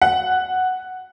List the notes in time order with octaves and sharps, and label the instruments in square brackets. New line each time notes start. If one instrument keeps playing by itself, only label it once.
[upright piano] F#5